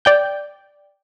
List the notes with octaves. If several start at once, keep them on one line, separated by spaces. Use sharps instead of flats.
D5 G5 G6